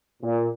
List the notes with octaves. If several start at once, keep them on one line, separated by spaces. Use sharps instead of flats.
A#2